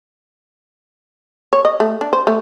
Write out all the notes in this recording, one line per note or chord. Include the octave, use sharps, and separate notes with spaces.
C#5
D#5
A3
D4
C5
A3